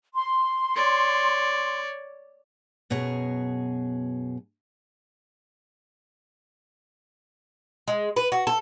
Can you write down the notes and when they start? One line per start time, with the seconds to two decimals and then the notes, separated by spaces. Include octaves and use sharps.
0.14 C6
0.75 C#5 D5
2.90 F#2 B2 G#4 C#5 A#5
7.88 G#3
8.16 B4
8.32 F#4
8.47 A4